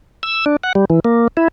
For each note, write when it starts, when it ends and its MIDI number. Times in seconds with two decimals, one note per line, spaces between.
0.23 0.45 88
0.46 0.56 62
0.64 0.73 78
0.75 0.85 55
0.90 1.00 52
1.05 1.28 58
1.37 1.48 64